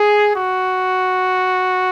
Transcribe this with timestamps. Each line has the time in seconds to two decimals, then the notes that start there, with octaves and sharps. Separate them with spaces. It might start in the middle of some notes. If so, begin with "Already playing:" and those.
Already playing: G#4
0.35 F#4